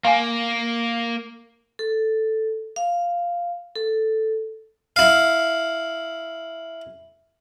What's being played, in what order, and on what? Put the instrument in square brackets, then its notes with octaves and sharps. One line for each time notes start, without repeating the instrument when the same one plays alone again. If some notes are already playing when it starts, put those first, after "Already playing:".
[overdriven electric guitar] A#3 [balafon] F5 G#5
[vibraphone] A4
F5
A4
[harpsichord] E4 F5